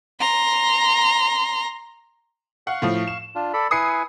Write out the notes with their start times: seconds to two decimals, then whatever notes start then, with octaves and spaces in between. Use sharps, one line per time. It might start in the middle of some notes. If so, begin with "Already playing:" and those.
0.19 A#5 C6
2.67 F5 F#5 C#6
2.82 A2 F3
3.07 E7
3.35 D4 F4
3.53 A4 D5 B5
3.71 E4 B4 G#5 D#6 C7 C#7